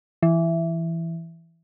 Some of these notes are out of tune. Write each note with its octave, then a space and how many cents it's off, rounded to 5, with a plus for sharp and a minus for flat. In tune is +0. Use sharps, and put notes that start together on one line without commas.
E3 +10